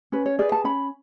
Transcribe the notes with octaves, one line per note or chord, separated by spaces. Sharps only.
C#4 B4
C#5
G#4 B4 D5
A5
C#4 B5